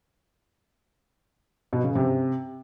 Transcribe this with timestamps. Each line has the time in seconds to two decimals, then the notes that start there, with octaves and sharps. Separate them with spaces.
1.73 B2
1.84 C#3
1.95 C3